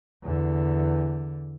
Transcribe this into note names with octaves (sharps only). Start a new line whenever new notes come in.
E2 D3